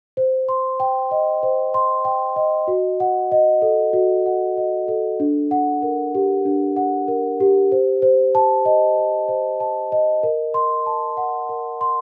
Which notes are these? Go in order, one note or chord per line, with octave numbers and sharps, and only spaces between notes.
C5
C6
G5
D#5
C5
C6
G5
D#5
F#4
F#5
D#5
A4
F#4
F#5
D#5
A4
D4
F#5
A#4
G4
D4
F#5
A#4
G4
C5
C5
A5
D#5
C5
C5
A5
D#5
A#4
C6
A5
F#5
A#4
C6